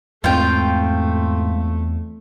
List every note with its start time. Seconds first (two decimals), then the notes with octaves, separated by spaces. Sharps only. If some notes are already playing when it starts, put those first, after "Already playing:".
0.24 E2 G#2 A3 C4 F4 G5